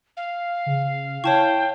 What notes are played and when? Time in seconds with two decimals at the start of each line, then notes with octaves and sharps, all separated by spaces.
0.17 F5
0.66 C#3
1.24 E4 C#5 G5 A5 C#6